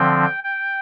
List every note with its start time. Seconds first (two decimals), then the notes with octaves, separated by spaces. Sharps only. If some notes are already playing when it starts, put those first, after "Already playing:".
Already playing: D3 F3 C4 G5
0.44 G5